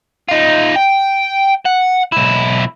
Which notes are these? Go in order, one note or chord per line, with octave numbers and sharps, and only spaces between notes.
D#4 F4
G5
F#5
B1 E4